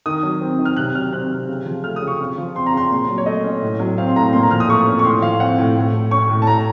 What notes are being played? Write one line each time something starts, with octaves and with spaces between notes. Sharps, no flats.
D#3 D#6
F#3
C4
D#3
F6
C3 F#6
F#3 F6
C4 F#6
C3
C#3
F3
A3 F6
D#6
C#3
C#6
C#3
F3
C4 C6
A#5
C#3 C6
A#2
F#3
C#5
A3 D#5
C#4
A2
F#3
C4 F5
C6
A2 A#5
A#2 C6
A#5
F3 F6
D#6
A3 C#6
C#4
C#6
A2 C6
F3 F5
C4 F#5
A2
A2
A3
C#4 C#6
A2
A5
A2 A#5